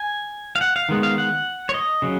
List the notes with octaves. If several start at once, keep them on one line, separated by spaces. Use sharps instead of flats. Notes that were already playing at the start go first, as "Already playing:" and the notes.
Already playing: G#5
F5
F#5
F5
D#3 G#3 B3
F5
F#5
C#5
D#5
C#3 F#3